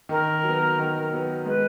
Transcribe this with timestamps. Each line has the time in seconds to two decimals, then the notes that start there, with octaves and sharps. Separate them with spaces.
0.09 D#3 A#4
0.43 F#3
0.48 B3
0.78 D#3
1.13 F#3 B3
1.46 G#3 B4